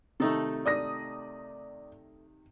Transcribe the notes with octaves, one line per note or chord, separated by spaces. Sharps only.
C3 D#3 A3 D#4 A4
D5 D#6 A#6